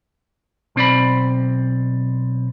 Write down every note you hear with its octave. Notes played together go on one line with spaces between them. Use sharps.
B1 C4 D5 B5